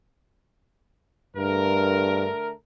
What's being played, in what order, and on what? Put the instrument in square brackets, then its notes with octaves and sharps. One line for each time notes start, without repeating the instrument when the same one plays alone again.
[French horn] G2 [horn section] D3 A3 A#4